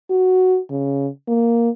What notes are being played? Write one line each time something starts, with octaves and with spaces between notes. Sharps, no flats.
F#4
C#3
A#3